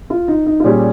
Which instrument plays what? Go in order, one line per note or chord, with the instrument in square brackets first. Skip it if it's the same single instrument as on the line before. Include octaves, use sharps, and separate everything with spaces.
[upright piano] F4
D#4
D#4
F4
[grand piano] A#2 G3 C#4 G#4 [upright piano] G4